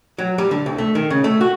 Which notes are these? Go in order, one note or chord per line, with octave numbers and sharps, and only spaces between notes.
F#3
G3
D3
C2
A3
D#3
C#3
A3
F#4